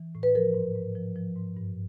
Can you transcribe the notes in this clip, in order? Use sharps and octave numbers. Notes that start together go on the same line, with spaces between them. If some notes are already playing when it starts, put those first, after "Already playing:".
Already playing: E3
A2
B4
F3 A#4
G#2
G#2
F3
F3
G#2
G2